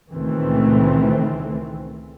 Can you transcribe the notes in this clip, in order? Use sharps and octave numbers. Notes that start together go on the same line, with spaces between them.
C#2 A#2 D#3 E3 A3 C4